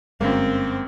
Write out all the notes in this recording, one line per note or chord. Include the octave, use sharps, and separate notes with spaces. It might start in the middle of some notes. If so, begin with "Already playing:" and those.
G1 F#2 G#3 A#3 C4